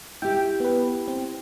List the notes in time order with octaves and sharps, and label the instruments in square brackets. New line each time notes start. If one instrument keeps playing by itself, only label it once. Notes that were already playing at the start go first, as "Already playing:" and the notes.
[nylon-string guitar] E4 G4 [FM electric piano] G5
[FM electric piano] B3 B4
C4